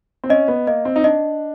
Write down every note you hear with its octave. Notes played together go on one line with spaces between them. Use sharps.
C4
C#4 D#5
B3
A#3 D#5
C4
D#4
D4 D#5